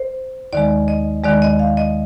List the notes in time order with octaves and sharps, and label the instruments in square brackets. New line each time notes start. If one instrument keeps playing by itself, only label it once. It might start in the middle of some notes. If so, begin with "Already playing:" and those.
Already playing: [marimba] C5
D#2 D#3 G#3 D5
D#5
D#2 D#3 G#3 D5
D#5
F5
D#5